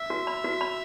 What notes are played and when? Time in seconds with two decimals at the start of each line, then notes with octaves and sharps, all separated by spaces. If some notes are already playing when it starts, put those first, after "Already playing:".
Already playing: E5
0.10 F#4
0.27 B5
0.44 F#4
0.61 B5